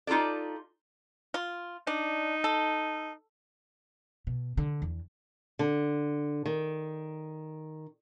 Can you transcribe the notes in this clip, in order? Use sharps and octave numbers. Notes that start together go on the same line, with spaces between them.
D#4 F4 G4 A4 D5
F4
D4 D#4
A4
B2
D3
E2
D3
D#3